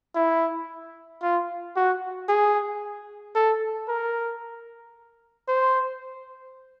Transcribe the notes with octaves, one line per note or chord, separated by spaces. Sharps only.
E4
F4
F#4
G#4
A4
A#4
C5